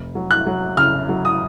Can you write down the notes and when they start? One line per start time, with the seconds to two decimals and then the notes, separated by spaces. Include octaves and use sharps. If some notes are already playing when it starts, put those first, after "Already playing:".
Already playing: F1
0.15 F#3
0.31 F#6
0.46 F#3
0.77 C#3 F6
1.09 F#3
1.25 D#6